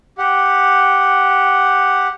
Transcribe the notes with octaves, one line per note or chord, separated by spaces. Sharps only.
G4 F#5